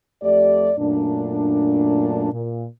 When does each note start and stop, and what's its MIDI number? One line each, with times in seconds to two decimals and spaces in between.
0.23 0.72 41
0.23 0.72 57
0.23 0.72 67
0.23 0.72 74
0.78 2.31 42
0.78 2.31 46
0.78 2.31 57
0.78 2.31 62
2.33 2.65 46